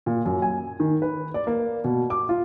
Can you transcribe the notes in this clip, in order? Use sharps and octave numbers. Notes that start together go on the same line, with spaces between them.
A#2
F#2
G#5
D#3
B4
D5
A#3
B2
D6
F4